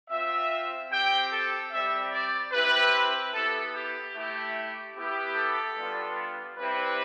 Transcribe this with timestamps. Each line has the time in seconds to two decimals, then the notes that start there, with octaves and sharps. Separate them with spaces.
0.10 C4 F4 E5
0.91 C4 G4 G5
1.31 A4
1.71 G3 C4 G4 E5
2.12 D5
2.52 C4 E4 G4 B4
3.33 B3 E4 G4 A4
3.74 G4
4.14 A3 E4 G4
4.95 B3 E4 G4
5.35 A4
5.76 G3 B3 D4 F4
6.57 G3 C4 E4 G4 B4